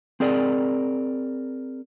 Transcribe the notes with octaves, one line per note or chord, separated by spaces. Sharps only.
C4 G#4 A#4 D5